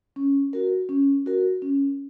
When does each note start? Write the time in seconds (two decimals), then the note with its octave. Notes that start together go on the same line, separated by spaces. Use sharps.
0.16 C#4
0.53 F#4 A#4
0.89 C#4
1.26 F#4 A#4
1.62 C#4